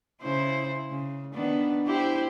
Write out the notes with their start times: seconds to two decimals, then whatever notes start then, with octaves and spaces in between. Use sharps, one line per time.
0.22 C#3 E4 C5
0.91 C#3
1.34 D#3 B3 D4
1.86 E4 G4 C5